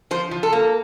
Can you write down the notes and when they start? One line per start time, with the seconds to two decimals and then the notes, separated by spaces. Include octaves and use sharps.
0.11 F3 C5
0.31 F3
0.43 A4
0.53 A#3